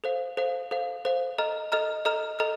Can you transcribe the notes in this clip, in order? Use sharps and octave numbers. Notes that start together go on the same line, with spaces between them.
A4 C5 F5
A4 C5 F5
A4 C5 F5
A4 C5 F5
A4 D#5 A#5 F6
A4 D#5 A#5 F6
A4 D#5 A#5 F6
A4 D#5 A#5 F6